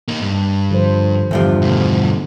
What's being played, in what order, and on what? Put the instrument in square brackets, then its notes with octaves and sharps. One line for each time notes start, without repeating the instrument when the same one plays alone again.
[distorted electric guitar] A#3 D#4
G2
[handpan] D3 F3 C5
[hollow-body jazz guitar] E2 G2 F3 [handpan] D3
[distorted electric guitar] D2 B2